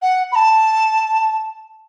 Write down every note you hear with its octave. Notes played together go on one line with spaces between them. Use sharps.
F#5
B5
A5